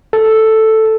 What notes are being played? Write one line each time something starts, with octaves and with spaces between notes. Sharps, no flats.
A4